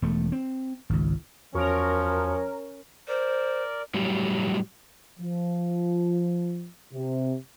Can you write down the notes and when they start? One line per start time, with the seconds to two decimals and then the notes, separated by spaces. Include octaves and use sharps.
0.02 E1 A3
0.32 C4
0.90 G#1 C#2
1.55 E2 F3 C#4 F#4 A#4 C#6
3.08 A#4 C5 D5
3.94 A2 F#3 G3
5.19 F3
6.93 C3